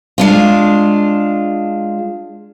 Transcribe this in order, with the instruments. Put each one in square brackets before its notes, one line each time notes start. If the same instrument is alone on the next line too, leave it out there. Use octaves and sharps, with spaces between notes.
[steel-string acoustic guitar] G#3 D4 F4